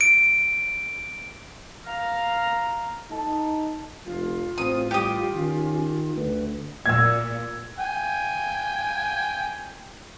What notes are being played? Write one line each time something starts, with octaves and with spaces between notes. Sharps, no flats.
D7
F5 A#5
D#4 A4
F1 F4
A1 C4 D#6
G3 G4 D#6
D#3 C#4
D2 B4
A#2 E6 G#6
G5 G#5